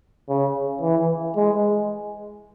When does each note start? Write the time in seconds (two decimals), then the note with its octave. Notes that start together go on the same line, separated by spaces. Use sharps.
0.29 C#3
0.81 E3
1.36 G#3